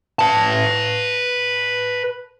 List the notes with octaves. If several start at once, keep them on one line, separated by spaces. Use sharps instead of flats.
B4 A5